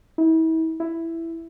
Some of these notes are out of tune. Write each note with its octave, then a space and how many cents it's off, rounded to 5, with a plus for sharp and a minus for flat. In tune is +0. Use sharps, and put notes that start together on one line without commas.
E4 -40
E4 +5